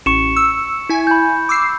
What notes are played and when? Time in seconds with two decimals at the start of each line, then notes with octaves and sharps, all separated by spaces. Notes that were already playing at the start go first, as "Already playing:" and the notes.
0.06 A1 C#6 C#7 E7
0.36 E6
0.89 E4 G#5 G#6
1.07 B5 G6
1.49 D6 E6 C7